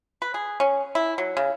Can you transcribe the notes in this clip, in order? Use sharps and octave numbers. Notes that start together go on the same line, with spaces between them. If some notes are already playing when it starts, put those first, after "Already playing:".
B4
G#4
C#4
E4
F#3
C#3